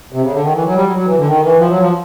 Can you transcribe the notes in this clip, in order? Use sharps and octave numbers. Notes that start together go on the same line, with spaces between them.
C3
C#3
D3
D#3
E3
F#3
G3
F#3
F#3
E3
D3
D#3
E3
F3
F#3
F3